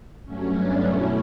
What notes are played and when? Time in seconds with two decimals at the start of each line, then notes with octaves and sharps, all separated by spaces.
0.24 G2 F#3 A3 C#4
0.55 B3 D4
0.84 E2 B2 F#3 A3 C#4 E4